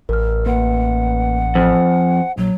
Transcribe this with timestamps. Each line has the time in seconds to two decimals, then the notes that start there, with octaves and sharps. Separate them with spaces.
0.09 A1 A#4 F6
0.46 A#3 B4 F#5
1.55 F2 C5 G#5
2.37 A#1 F#3